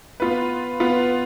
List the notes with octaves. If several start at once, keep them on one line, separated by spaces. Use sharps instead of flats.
B3 F4 B4
B3 F4 B4